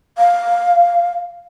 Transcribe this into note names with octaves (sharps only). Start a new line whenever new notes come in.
F5